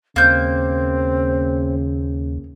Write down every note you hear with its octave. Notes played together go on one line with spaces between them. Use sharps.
D#2 C#3 A#3 C4 G6